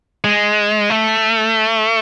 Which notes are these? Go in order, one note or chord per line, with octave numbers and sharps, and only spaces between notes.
G#3
A3